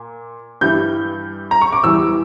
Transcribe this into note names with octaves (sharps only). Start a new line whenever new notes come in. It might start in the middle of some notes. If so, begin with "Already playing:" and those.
Already playing: A#2
G2 E3 G3 G6
A#5
C#6
D6
E2 E3 G3 E6